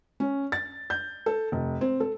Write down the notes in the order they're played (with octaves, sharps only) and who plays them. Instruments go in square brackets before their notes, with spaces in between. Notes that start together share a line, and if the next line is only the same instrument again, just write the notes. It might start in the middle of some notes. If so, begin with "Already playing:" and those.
[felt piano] C#4
A6
G6
A4
F1
C4
A4